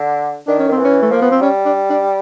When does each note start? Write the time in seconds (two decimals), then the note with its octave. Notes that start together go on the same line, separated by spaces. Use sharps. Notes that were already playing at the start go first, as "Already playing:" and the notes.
Already playing: D3
0.47 D#3 D4
0.59 C#4
0.69 D#3 C4
0.78 E3
0.85 C#4
1.02 A3
1.11 F3 A#3
1.22 B3
1.31 C4
1.41 G3 C#4
1.65 D4
1.90 D4